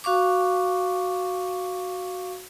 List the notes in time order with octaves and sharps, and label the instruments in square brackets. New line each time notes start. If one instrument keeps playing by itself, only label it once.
[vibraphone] F#4 F5 C#6 D6